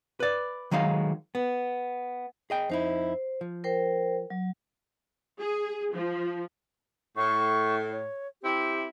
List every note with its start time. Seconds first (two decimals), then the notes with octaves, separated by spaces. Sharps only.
0.20 B4 D5
0.71 D#3 F#3 G#3 D#4 F5
1.35 B3
2.50 G#4 D#5 G5
2.70 F2 D#4 E4 C5
3.41 F3
3.64 A#4 C5 G5
4.30 F#3
5.39 G#4
5.94 F3
7.17 A2 C#6
7.91 C#5
8.42 C4 E4 G4